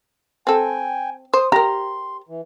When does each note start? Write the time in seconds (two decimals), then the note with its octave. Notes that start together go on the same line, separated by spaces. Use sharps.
0.47 C4 A4 G5 G#5
1.34 C5 D#6
1.52 G4 A#4 A#5 C6
2.29 E3